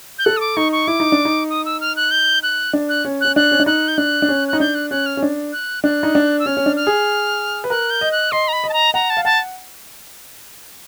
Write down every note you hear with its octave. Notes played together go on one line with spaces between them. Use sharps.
G6
A4 F#6
D#6
D6
D#4 C#6
C#6
E4 D6
D#4
D4
D#4
D#6
E6
F6
F#6
G6
F#6
D4
F#6
C#4
C#4 F#6
D4 F#6
C#4
D4
D#4 F#6
G6
D4 F#6
D4
C#4
D#4 F#6
D4 G6
F#6
C#4 F#6
F6
C#4
D4
F#6
D4 F#6
D#4
D4
E6
C#4 F6
C#4
D4
F6
G#4
B4
A#4 F#6
G6
D#5
F#6
D#5 C6
A#5
B5
D#5
A5
A#5
F#5 A#5
A5
F5
F#5 A5